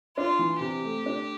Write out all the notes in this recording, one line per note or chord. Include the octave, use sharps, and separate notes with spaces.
D4 F4
E3
C3 G4
A3
D4